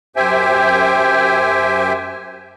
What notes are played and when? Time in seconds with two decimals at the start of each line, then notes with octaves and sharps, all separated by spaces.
0.16 F#2 G4 C5 E5 G5 G#5